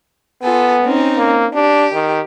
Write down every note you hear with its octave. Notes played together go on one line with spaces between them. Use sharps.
B3 F4 A4 G#5
C4 C#4 D#4
A#3
D4 G4
D#3